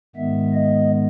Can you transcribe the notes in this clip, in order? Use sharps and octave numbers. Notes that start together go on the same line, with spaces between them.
G#2 D#3 G#3 B3 E5
D#5